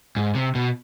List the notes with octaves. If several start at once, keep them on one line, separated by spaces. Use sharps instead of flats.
G#2
C3
B2